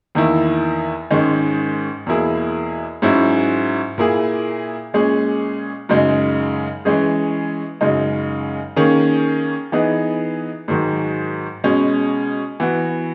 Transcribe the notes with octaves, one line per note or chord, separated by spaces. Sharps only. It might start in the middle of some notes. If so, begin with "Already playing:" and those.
E2 D#3 A#3 E4
G#2 D#3 G#3 C#4
E2 B2 A#3 E4 G#4
G#2 F#3 C#4 E4
A#2 A#3 E4 G#4
A#2 G#3 C#4 G#4
F#2 C#3 G#3 D#4
E3 G#3 C#4 G#4
F#2 C#3 G#3 D#4
D#3 A#3 C#4 G#4
E3 B3 D#4 G#4
G#2 D#3 F#3
B2 G#3 C#4
E3 B3 F#4